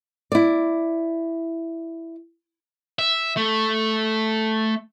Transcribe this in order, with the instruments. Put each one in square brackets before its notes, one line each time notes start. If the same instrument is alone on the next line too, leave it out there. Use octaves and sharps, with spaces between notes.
[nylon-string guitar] E4 D5
[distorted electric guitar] E5
A3